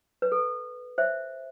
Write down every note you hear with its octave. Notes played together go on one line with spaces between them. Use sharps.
B4
A4
C5 E5